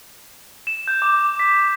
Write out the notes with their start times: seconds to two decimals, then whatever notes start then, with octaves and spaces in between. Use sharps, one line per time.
0.67 E7
0.87 G6
1.02 D6
1.40 B6